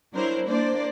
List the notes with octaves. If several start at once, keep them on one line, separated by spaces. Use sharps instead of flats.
F#3 D4 E4 A#4 C5
A#3 D4 C5 D5